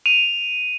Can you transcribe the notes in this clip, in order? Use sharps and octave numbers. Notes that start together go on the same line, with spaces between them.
D#7 F7